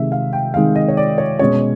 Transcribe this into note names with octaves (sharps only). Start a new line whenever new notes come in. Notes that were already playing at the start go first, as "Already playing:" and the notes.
Already playing: C3 D#3 G#3 E5
F5
G5
C3 D#3 G#3 F5
D#5
C#5
D5
C#5
B2 G#3 C#4 C#5